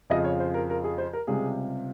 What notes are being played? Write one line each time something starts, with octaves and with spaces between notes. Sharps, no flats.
F2 C#3 F3 D#5
C#5
C5
A#4
A#4
G#4
C5
A#4
C#2 C3 G3 G#4